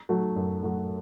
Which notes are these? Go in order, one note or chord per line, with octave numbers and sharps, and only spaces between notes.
F#3 A3 F#4
F#2
F#3 A3 F#4